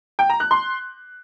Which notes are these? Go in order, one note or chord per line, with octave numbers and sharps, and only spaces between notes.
G5
A#5
F#6
C6